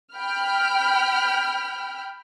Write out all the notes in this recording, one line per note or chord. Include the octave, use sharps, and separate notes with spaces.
G5 B5 F6